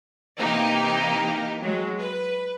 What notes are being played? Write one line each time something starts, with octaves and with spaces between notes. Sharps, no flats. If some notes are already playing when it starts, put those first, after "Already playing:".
C3 E3 A#3 D#4 G4
F#3 G#3
B4